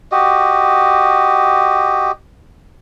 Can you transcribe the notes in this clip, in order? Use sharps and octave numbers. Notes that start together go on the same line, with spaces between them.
F#4 G4 D#5